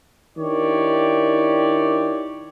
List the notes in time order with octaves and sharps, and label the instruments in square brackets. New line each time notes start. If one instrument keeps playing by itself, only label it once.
[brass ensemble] D#3 D4 E4 G4 C#5 D5